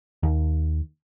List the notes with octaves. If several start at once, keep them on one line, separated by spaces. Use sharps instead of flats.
D#2